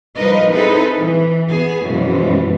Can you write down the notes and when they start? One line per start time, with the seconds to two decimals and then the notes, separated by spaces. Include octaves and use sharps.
0.16 F3 G3 D#4 A#4 B4 D#5
0.50 C4 D#4 E4 G#4 A4 B4
0.99 E3
1.49 B3 G#4
1.85 F#2 B2 E3 F3 G#3